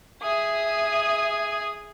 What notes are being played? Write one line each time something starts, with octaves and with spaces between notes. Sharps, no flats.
G#4 E5 D#6